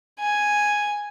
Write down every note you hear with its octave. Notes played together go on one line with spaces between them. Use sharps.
G#5